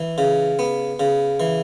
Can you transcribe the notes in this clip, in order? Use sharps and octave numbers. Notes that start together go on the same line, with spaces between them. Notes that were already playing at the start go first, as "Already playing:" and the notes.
Already playing: E3
C#3
B3
C#3
E3